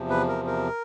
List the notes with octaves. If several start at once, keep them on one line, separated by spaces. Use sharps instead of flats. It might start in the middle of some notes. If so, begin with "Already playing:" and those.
Already playing: E2 C3 F3
B4
A#4
A#4